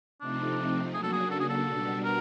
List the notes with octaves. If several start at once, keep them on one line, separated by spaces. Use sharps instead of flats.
C3 F3 A3 C4 D4 D#4
C#3 F#3 A#3 D4 F#4 G#4
A4
G#4
A4
G#4
A4
B2 G3 B3 D4 F#4
A#4